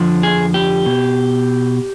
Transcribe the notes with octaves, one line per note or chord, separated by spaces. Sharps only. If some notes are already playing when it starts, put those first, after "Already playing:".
Already playing: F2 D3 F3
G#4
G4
B2